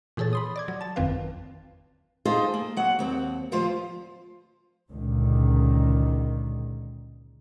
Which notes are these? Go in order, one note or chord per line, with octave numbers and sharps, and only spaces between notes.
A#2 E3 G#4 A4 C#5 A6
B5 C6 D#6
D5 D6 G#6
F#3
A5 A6
G#1 F2 D#3 C4 B4 F5
D#4 F4 G#4 A4 C5
A#3
F#3 F#5
D#2 C4
D2 F3 F4 C5
C#2 A#2 D3 D#3